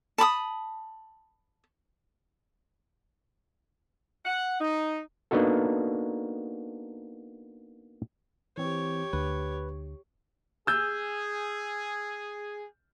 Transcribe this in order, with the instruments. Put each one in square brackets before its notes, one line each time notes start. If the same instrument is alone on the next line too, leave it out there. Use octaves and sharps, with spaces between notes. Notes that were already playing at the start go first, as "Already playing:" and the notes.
[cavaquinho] A5 B5 D6 D#6
[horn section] F#5
D#4
[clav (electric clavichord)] A#3 B3 D4 D#4 F#4 A4
[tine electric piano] E3 C4 [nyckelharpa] G4 C#5
[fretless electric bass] D2 [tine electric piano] B4
[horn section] G#4 [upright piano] E6 G6